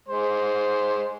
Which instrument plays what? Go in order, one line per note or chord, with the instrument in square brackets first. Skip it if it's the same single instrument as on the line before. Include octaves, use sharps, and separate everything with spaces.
[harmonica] G#3 C5